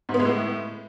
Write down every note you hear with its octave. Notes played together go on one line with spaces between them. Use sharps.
G#2
B3
G#3
A2